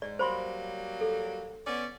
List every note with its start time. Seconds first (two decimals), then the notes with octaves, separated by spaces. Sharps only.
0.02 G#2 D5
0.19 F#3 G3 A#3 C5 B5 C6
1.01 A4
1.66 B3 C#4 D5